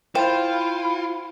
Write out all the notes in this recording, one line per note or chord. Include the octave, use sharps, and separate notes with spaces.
E4 F4 C5 E5 G5